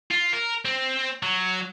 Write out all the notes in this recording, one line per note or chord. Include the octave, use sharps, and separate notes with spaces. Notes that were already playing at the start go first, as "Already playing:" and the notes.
F4
A#4
C4
F#3